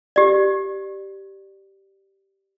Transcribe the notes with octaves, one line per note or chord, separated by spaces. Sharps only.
G4 D5